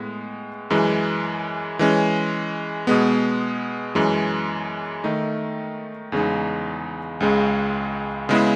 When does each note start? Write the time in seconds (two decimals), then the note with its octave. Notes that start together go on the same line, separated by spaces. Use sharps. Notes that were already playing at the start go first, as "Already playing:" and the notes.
Already playing: A2 G#3 B3
0.70 F#2 E3 G#3
1.79 E3 G#3 C#4
2.87 B2 G#3 B3
3.95 F#2 E3 G#3 C#4
5.04 D#3 A3 D#4
6.12 E2 C#3 G#3 D#4
7.20 C#2 C#3 G#3
8.29 C#3 G#3 B3 E4